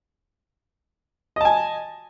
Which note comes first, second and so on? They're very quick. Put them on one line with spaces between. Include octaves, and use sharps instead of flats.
D#5 A5 G#5